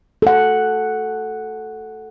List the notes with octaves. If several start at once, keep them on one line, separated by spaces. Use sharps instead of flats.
A4 F#5